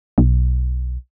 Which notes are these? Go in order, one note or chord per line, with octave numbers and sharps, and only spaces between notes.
B1